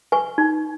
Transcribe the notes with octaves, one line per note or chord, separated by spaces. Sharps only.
B4 G#5 C#6
D#4